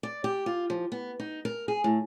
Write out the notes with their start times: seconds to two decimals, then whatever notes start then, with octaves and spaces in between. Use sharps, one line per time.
0.03 D5
0.24 G4
0.46 F4
0.70 F3
0.92 B3
1.20 D#4
1.45 A#4
1.68 G#4
1.84 A2